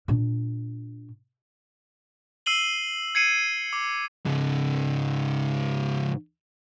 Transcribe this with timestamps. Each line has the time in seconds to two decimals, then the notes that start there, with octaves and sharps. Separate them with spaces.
0.08 A#2 D4
2.46 E6 C7 D#7 F#7 G7
3.15 G#6 C7 C#7 D#7
3.73 D6
4.26 G#2 C#3